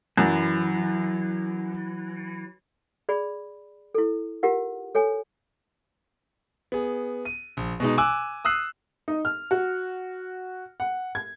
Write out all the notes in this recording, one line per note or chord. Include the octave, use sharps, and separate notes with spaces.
F#2 E3 F#3
G#4 D5 B5
E4 A4
F4 G4 A#4 F#5
A4 C#5 G#5
B3 G#4
D#7
A#1
B2 G#3 D#4
G#5 D6 E6 F#6
D#6 E6 F#6 C7
D#4
F6
F#4
F#5
G#6